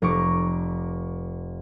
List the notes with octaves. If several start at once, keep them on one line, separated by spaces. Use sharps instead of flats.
F1 A#5 C#6 D6